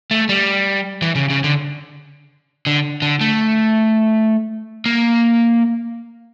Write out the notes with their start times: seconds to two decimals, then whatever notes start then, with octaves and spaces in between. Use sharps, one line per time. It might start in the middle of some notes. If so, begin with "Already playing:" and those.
0.11 A3
0.29 G3
1.02 E3
1.16 C#3
1.30 C#3
1.44 D3
2.66 D3
3.02 D3
3.21 A3
4.86 A#3